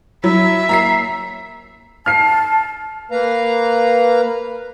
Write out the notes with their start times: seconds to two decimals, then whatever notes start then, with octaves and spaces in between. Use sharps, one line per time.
0.24 F#3 E4 E5
0.69 A#3 A#5 B6 C7
2.06 A5 F6 C7
3.11 A#3 B4 F5 A#5